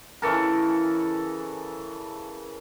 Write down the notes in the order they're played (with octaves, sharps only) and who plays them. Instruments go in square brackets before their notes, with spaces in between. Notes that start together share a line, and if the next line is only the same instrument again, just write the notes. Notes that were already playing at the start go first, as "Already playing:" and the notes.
[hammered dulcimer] C#3 E3 A4 A#4